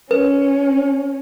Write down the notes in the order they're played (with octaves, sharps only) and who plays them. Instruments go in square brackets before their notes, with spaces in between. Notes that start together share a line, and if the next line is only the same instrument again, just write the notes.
[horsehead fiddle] C#4 [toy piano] B4